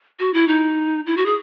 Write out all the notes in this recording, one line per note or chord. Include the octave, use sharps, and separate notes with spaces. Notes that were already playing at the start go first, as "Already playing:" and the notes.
F#4
E4
D#4
E4
F#4
G#4